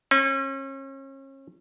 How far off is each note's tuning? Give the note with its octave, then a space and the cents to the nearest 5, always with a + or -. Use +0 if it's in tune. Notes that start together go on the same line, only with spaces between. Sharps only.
C#4 -40